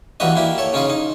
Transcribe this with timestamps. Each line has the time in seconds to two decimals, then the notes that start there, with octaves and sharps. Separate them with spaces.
0.20 E3 G3 A#3 F#4 G4 D#5
0.36 A#3 E4 G4
0.58 A4 C#5
0.73 C#3 C#4 D#4 F4 G#4
0.90 D#4